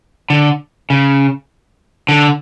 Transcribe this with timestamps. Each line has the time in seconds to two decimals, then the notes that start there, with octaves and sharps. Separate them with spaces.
0.30 D3
0.90 C#3
2.09 D3